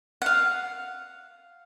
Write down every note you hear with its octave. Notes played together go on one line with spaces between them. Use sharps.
F5 F#5